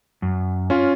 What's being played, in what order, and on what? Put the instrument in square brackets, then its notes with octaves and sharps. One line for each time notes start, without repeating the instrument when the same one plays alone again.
[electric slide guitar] F#2
[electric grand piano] C#4 F4